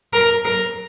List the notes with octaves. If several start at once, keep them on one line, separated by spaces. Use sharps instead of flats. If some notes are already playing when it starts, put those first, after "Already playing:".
A#4
A#4